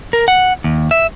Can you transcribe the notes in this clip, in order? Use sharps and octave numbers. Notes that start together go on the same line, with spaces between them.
A#4
F#5
D#2
E5